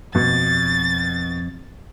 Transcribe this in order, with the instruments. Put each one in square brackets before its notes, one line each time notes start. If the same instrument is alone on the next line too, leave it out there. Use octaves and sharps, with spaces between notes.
[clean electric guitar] F2 [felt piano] B2 [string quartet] A6